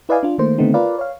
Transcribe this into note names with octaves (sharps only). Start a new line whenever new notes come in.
E4 B4 D5 D#5 F5 G#5
D4 F4
D#3 A3 A#3 C5
D3 D#3 A3 B3 C4 D#4
F4 A#4 B4 D5 F5
C#5 F5